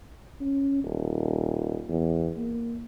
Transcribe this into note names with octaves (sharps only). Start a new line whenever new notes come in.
C#4
D#1
E2
A#3